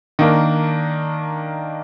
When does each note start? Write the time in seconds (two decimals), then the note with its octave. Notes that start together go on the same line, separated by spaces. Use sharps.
0.19 D#3 A#3 D4